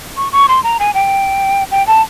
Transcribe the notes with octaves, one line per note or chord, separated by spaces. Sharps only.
C#6
C#6
C6
A#5
G#5
G5
G5
A5